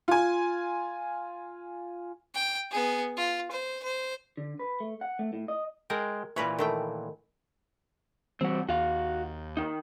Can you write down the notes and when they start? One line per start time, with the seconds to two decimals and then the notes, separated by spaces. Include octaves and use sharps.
0.08 F4 G#5
2.34 G5
2.71 B3 G#4
3.17 F4
3.51 C5
3.83 C5
4.37 D3
4.59 B4
4.80 A3
5.01 F#5
5.19 A3
5.33 A2
5.48 D#5
5.90 G#3 A#4 G5
6.36 A#2 E3 A#4 B4 C#5
6.59 D#3 A3 G5
8.41 E3 G3 C4 F#4
8.69 D#2 F#4 F5
9.57 D#3 D#4